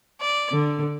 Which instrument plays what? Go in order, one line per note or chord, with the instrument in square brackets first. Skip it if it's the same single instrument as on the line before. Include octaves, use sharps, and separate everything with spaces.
[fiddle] D5
[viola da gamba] D3